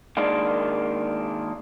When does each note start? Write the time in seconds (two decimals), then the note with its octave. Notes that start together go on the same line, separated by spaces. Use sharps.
0.17 D#3 G#3 A#3 D4 F4